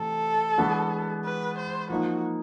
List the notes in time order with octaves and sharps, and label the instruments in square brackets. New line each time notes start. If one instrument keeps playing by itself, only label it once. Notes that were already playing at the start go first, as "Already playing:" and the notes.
Already playing: [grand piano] C3 E3 A3 [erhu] A4
[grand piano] E3 G#3 B3 D4 F#4
[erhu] B4
C5
[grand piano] F3 A#3 D#4 [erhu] F#4